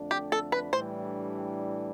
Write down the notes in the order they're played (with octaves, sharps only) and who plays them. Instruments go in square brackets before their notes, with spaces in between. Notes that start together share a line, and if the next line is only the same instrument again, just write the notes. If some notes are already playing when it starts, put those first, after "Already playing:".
Already playing: [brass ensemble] F2 D3 A3 D4
[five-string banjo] G4
A4
B4
[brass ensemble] A2 E3 G3 D4 [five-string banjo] C5